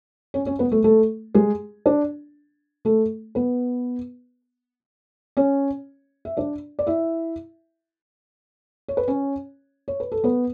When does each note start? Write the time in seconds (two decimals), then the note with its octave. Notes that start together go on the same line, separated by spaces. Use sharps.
0.34 C#4 C#5
0.46 C#4 C#5
0.59 B3 B4
0.72 A3 A4
0.84 A3 A4
1.34 G#3 G#4
1.86 D4
2.85 A3 A4
3.35 B3 B4
5.37 C#4 C#5
6.25 E5
6.37 D4 D5
6.79 D5
6.87 E4 E5
8.88 C#5
8.97 B4
9.08 C#4 C#5
9.88 C#5
10.00 B4
10.12 A4
10.24 B3 B4